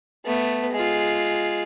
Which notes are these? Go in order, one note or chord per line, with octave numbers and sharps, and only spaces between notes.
A3 B3
G#3 F4